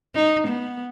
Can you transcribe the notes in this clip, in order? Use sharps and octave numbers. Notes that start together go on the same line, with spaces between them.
D#4
B3